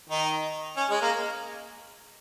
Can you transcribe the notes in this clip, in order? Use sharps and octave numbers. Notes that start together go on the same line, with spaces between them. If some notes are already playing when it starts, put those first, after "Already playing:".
D#3 D#4
C#4
G#3
A#3